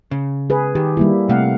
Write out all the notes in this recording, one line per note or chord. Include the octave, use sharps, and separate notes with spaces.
C#3
G#4 B4
D#3 G4
G3 A#3 E4
C3 A3 F5 F#5